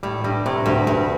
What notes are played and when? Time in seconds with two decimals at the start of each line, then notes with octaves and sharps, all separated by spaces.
0.03 A2 G3
0.24 G2 G3
0.46 A2 C3
0.66 D2 G2
0.87 D2 G2